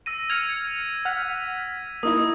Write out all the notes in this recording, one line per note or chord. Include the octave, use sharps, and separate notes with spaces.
E6 A#6 D#7
F6 G#6 C#7 F7
F#5 F6 B6
A#3 D#4 E4 D#6